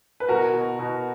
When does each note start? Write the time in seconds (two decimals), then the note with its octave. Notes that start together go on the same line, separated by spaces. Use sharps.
0.20 B4
0.29 B2 F#4 A#4
0.54 B2
0.79 B2